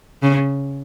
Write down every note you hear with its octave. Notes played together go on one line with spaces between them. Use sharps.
C#3